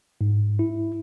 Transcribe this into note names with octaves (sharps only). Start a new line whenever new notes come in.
G#2
E4